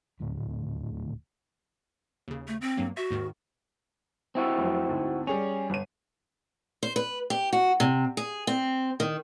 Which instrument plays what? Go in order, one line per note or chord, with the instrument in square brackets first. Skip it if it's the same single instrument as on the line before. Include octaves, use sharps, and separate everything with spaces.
[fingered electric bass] D#1 D2 A2
[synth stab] D#2 C#3
[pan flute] A3
C4
[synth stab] G2 F#3 A#3
[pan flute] F#4 [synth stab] E5
[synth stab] D#2 G#2 D#3
[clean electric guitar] C4 E4 F#4
[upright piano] F1 F#3
D2 G#2
[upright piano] G3 G#4 F7 [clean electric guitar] C#4
[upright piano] G1 D#7
[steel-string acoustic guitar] C5
B4
G4
F#4
C3
G#4
C4
D#3